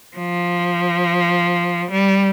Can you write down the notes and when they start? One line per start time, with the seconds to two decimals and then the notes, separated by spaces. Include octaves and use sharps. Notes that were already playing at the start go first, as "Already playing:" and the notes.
0.17 F3
1.91 G3